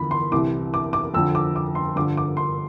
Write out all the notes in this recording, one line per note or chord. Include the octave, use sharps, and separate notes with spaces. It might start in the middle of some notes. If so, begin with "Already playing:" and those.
Already playing: E2 D3 F3 B5
C6
C2 C3 E3 D6
D6
D6
F2 D3 F3 E6
D6
D6
C6
G2 D3 F3 D6
D6
C6